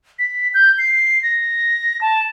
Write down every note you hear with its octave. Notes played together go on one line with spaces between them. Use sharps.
B6
G6
C7
A#6
A5